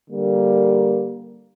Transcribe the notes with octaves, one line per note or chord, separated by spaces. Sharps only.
D3 G3 A#3